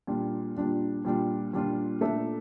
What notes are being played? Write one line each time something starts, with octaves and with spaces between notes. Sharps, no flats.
A#2 G3 D4 F4
A#2 G3 D4 F4
A#2 G3 D4 F4
A#2 G3 D4 F4
A#2 A3 D4 A4 E5